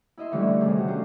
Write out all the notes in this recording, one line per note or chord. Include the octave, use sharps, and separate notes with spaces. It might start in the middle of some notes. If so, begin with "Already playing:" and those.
E4 D#5 E5 C6
D3 E3 F3 G3 A3 C#4
F2
C3 D#3 G3 D4 G#4
F#3 F#4
A3 C#4 F4 C5